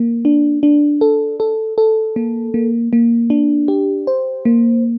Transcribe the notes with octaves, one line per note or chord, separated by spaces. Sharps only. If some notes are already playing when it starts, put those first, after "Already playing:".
Already playing: A#3
D4
D4
A4
A4
A4
A#3
A#3
A#3
D4
G4
C5
A#3